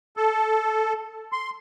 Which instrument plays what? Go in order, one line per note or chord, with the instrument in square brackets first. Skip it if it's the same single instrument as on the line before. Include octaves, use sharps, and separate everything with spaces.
[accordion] A4
C6